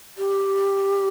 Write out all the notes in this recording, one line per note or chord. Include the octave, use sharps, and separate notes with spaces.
G4